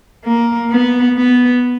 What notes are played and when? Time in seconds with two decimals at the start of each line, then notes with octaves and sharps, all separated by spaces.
0.25 A#3
0.71 B3
1.17 B3